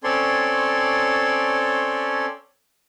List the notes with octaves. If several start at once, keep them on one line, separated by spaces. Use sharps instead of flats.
C4 C#4 A4 C#5 D5 C6